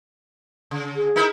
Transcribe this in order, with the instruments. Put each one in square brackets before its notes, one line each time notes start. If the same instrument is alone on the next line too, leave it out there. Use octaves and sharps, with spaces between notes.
[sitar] C#3
[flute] G#4
[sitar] D#4 E4 A#4